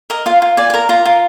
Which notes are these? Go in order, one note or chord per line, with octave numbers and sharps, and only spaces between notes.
A#4 D#5
F4 F5
F4
D5 G#5
G#5
A#4 A#5
F4 A#5
F4